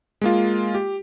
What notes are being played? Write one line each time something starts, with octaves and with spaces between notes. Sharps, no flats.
G#3 A#3 F4
G4